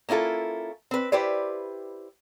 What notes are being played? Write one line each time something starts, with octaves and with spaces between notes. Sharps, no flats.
A#3 C#4 E4 F4 A4
C4 B4
E4 G4 B4 C5 D5